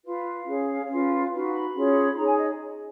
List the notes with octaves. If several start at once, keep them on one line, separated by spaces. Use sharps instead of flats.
F4 B4 F5
C#4 G#4 C#5
C#4 F4 B4
D#4 F#4 B4 F5
B5
C#4 F4 G#4 C#5
D#4 G#4 C#5 A#5
G#5
D#5